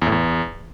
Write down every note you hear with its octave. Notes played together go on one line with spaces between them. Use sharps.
E2
A2
E2